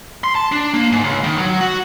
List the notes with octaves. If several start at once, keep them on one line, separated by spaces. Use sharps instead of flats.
C6
A5
D4
A#3
G#2
C#2
D#3
F#3
F#4